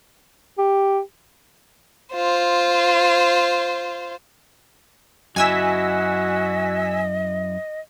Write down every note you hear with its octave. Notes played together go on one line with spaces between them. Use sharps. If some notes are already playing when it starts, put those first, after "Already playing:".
G4
F4 C5
F#2 E4 F#4 D#5 G#5 E6 B6